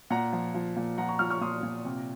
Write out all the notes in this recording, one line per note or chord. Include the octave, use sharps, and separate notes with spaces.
A#2 F#5 A#5
F3
F3
A#2
F3 F#5 A#5
A#5 C#6
F3 C#6 F6
C#6 F6
A#2 C6 D#6
A#2
C3